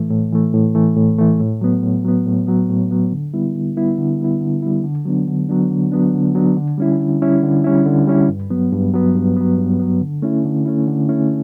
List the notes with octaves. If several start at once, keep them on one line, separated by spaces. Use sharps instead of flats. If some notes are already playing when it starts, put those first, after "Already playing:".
Already playing: A2 E3 A3
A2
E3 A3
A2
E3 A3
A2
E3 A3
A2
F#3 B3
A2
F#3 B3
A2
F#3 B3
A2
F#3 B3
D3
G3 B3 E4
D3
G3 B3 E4
D3
G3 B3 E4
D3
G3 B3 E4
D3
F#3 B3 D4
D3
F#3 B3 D4
D3
F#3 B3 D4
D3
F#3 B3 D4
D3
G3 C#4 E4
D3
G3 C#4 E4
D3
G3 C#4 E4
D3
G3 C#4 E4
G2
F#3 B3
G2
F#3 B3
G2
F#3 B3
G2
F#3 B3
D3
A3 C#4 E4
D3
A3 C#4 E4
D3
A3 C#4 E4